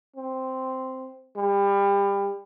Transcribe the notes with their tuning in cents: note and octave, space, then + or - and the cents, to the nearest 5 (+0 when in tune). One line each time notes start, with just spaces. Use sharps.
C4 -5
G3 +30